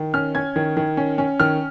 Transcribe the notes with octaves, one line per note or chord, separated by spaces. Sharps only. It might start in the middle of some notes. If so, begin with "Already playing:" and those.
Already playing: D#3
C#4 F6
C#4 G#6
D#3
D#3
C#4
C#4
D#3 F6